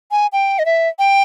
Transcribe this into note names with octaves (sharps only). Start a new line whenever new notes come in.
G#5
G5
D#5
E5
G5